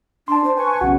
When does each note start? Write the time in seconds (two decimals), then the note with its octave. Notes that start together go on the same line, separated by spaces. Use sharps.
0.28 D4 A5 C6
0.44 C5
0.57 B4 G#5 C#6
0.81 B1 C#3 F#4 F#5